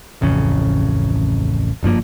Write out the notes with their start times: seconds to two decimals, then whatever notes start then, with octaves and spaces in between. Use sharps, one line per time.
0.21 D1 A1 F2 C#3
1.83 F#1 G2 F3 A#3